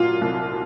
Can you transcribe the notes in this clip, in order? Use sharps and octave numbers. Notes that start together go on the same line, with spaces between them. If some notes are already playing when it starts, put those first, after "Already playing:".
Already playing: A#2 F#3 F4
C2